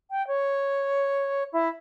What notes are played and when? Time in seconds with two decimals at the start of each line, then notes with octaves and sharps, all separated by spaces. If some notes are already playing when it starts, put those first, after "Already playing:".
0.10 G5
0.27 C#5
1.52 E4